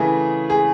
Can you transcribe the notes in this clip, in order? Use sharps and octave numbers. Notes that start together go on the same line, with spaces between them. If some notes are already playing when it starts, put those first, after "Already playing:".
Already playing: C#3 E3 A3 G#4
G#4